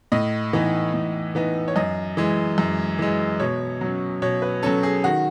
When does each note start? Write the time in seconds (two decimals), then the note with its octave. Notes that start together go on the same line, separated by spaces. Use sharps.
0.12 A2 D#5
0.53 E3 B3 D#4
0.93 A2
1.35 E3 B3 D#4
1.68 C#5
1.76 F#2 D#5
2.17 E3 G#3
2.58 F#2
2.99 E3 G#3
3.40 B2 C#5
3.81 F#3 C#4
4.22 B2 C#5
4.42 B4
4.63 F#3 C#4 A4
4.83 G#4
5.04 D#3 F#4